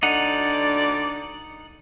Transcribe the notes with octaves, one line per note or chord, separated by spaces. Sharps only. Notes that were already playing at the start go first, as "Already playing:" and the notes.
D3 D#4 D5 F#5